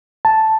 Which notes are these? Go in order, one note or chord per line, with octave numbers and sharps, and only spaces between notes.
A5